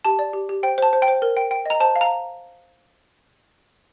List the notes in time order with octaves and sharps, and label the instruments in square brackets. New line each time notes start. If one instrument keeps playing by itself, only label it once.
[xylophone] G4 A5
D5
G4
G4
C5 G5
C5 A5
C5
G5
C5
A#4
G5
G5
D#5 A#5
C5 A5
F5
A#5